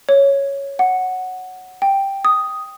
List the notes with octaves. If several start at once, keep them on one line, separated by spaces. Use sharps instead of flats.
C#5
F#5
G5
D#6